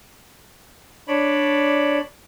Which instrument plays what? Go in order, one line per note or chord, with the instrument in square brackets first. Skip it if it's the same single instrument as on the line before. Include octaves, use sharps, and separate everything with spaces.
[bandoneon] D4 C#5 D5 B5